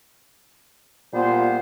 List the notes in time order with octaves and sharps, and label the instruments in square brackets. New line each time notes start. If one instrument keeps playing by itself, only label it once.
[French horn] A#2 [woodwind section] G3 B3 C5